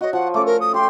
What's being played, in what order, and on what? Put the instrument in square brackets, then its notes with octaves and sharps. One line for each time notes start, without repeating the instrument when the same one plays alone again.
[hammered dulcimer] F#4 C#5 [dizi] D#5
[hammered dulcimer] F3 [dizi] F#5
[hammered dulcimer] A3 C#4 [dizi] D6
[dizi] A#4
D#6
[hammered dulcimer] G4 G5 [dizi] C6